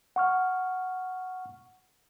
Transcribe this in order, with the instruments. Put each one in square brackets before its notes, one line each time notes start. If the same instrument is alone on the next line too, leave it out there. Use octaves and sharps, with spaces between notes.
[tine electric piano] F#5 C#6 F6